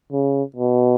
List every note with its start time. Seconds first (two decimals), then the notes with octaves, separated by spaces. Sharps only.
0.12 C#3
0.56 B2